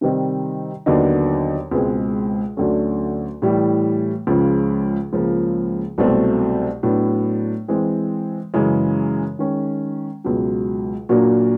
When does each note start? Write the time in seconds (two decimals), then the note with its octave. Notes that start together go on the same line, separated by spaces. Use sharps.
0.01 C3 D#3 G3 C4 D#4
0.86 D#2 D3 F#3 B3 D#4
1.71 C#2 B2 G#3 C4
2.57 D2 D3 F#3 A3 C#4
3.42 A2 E3 G3
4.27 C#2 C#3 F3
5.13 C#2 C#3 F3 A#3
5.98 C2 B2 F#3 A3 C4
6.83 A2 F#3 B3 D4
7.68 E3 G#3 C4
8.54 F#2 C#3 E3 G#3
9.39 D#3 G#3 C#4
10.24 C#2 B2 F#3
11.09 A#2 F#3 A#3 D4 F#4